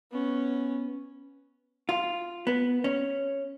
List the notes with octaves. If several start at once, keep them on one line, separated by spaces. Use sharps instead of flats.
B3 C#4
F4
B3
C#4